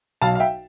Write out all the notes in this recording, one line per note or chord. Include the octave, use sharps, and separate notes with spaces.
B1 F5 A5
F5
E5 G5